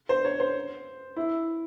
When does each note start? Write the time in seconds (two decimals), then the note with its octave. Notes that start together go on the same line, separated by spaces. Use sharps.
0.09 C5
0.25 C#5
0.40 C5
1.16 E4